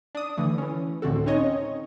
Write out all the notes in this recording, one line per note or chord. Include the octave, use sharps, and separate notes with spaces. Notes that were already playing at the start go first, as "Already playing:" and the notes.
D4 D#6
D3 E3 A3
E3 C#4
C#2 A2 D3 C4 F#4 A4
C4 C#4 D#4 C#5 D#5